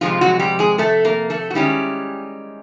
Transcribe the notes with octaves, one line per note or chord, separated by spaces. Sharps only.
F2 C3 F3 G#3 F4
F#3 F#4
G3 G4
G#3 G#4
A3 A4
A#3 A#4
A3 A4
F#4
D#3 G3 G#3 C#4 E4 G4